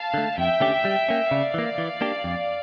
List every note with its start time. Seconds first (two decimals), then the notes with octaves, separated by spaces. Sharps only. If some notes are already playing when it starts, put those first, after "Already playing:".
Already playing: F5 A5
0.14 D3 A3
0.38 F2 E5 G5
0.61 D3 A3 C#4 G4
0.85 G3
1.09 A#3 C#4
1.31 C#3 D5 F5
1.54 E3 A#3
1.78 E3
2.01 A#3 D4 G4
2.24 F2